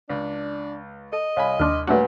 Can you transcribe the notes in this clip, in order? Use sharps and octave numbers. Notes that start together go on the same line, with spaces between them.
C#2 D4
A4 D#5
C2 C#5 F5 G#5 B5
D#2 D4 C6 D6 F6
A#2 F#3 G3 A3 D4 F#4 B4 F#5